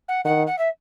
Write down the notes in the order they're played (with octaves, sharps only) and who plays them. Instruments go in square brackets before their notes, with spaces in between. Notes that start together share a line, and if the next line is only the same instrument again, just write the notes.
[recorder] F#5
[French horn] D#3 [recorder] F#5
[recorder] F#5
E5